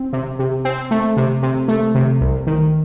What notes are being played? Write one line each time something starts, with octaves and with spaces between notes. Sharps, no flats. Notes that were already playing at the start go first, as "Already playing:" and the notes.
Already playing: C4
C3
C3
C4
A3
C3
C3
A3
C3
C2
D#3